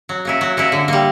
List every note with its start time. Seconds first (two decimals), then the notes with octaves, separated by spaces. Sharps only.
0.09 F#3
0.25 A#3 C#4 E4
0.41 F#3
0.57 A#3 C#4 E4
0.72 D3
0.88 G3 A#3